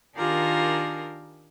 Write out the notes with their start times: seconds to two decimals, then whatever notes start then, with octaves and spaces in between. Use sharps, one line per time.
0.16 D#3 D4 F4 G4 G#4 A#4